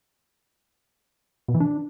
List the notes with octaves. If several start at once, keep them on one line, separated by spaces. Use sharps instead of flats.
B2
E3
D4